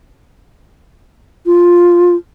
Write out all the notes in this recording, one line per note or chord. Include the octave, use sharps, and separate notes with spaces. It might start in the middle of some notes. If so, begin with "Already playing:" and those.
F4